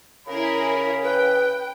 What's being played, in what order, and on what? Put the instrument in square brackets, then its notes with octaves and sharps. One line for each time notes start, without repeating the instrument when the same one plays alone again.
[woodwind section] C#3 C#4 [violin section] E4 G#4 A#4 [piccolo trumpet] B5
[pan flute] B4 [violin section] G5